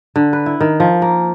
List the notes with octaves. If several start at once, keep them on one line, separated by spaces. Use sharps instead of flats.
D3
B4
E4
D#3
F3
A#3